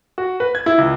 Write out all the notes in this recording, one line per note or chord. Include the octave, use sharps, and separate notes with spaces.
F#4
B4
G#6
E4
C#2